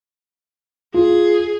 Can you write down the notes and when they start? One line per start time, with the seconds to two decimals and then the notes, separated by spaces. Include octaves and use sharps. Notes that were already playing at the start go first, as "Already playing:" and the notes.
0.94 F4 G#4